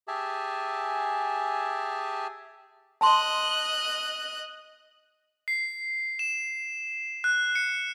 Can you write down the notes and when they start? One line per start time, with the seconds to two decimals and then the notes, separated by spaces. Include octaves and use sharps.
0.08 G4 G#4 E5 G#5 A5
3.01 D#5 A5 C6 F#6
5.48 C7
6.19 E7
7.24 F#6
7.55 C#7